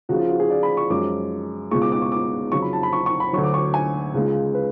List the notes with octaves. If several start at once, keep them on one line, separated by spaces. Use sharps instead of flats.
C#2 C#3 F3 F#4
F4
F#4
G#4
D5
B5
C#6
F#2 F3 G#3 D6
C#2 B2 G#3 C#6
D6
D6
C#6
D6
F2 C#3 F#3 C#6
B5
A5
B5
C#6
C#6
B5
D2 D3 F#3 C#6
D6
C#6
G#5
C#2 C#3 G#3
B4